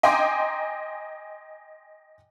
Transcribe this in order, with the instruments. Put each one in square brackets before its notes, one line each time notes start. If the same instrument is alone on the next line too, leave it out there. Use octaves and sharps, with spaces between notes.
[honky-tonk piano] D#5 G5 G#5 A#5 C6 D6